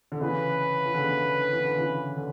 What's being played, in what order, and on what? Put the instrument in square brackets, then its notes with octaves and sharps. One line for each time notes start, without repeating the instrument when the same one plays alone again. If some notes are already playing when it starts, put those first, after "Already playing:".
[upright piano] D3
[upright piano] C#3 E3 [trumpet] B4
[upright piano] E3
D3
C#3
D3
E3
D3
C#3 E3
D3